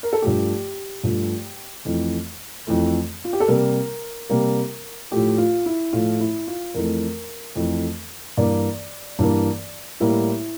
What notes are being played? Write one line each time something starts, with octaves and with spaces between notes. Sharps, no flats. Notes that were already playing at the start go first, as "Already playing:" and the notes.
A#4
A4
G2 F3 A3 G4
G2 F3 A3
F2 E3 A3
F2 E3 A3
F4
G4
A4
C3 G3 A#3 A#4
C3 G3 A#3
A2 F3 A3 G4
F4
E4
A2 F3 A3 F4
E4
F4
F2 E3 A3 A#4
F2 E3 A3
G2 E3 A#3 D5
G2 E3 A#3
A2 G3 A#3 E4